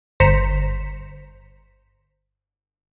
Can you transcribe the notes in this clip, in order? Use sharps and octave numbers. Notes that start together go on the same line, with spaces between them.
G1 C5 A#5 B6 C#7 E7